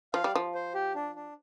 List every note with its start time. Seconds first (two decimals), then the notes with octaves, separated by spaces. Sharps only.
0.14 F3 F5
0.24 G3
0.35 F3
0.55 C5
0.74 G4
0.95 D4
1.15 D4